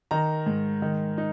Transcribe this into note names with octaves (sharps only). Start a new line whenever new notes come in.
D#3 A#5
G#2
D#3
D#4